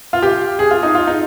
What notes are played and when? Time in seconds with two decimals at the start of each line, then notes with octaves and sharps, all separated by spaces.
0.13 F4
0.22 G4
0.59 G#4
0.71 F4
0.83 D#4
0.95 F4
1.07 D#4